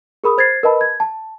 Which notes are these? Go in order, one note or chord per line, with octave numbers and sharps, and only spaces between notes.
G#4 A#4 B5 D#6
C5 G#6 A6 C7
A#4 B4 D#5 A5 B5
G#6
A5